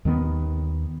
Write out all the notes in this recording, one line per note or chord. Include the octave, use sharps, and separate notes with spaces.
D#2 D#3 A3 B3